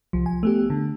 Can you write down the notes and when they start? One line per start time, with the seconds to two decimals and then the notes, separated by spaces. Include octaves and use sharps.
0.13 C2 F3
0.26 G#5
0.43 A3 B3 G4
0.70 D3